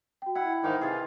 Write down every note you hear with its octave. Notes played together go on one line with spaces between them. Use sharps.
F#4 G5
E4 F#5 G5
G#2 D#3 E3 D#4 F5 D6
C3 F4 G#4